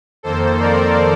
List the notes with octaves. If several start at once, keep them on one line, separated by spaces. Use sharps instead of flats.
F2 D#3 A#3 A4 C5
A#4 D5